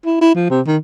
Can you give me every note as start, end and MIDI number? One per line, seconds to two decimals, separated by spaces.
0.06 0.17 64
0.21 0.33 64
0.35 0.46 53
0.50 0.61 48
0.67 0.77 51